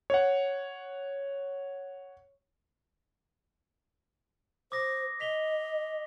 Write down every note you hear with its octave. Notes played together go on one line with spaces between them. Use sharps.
C#5 F#5
C5 D6 D#6 A#6
D#5 B6 F7 G7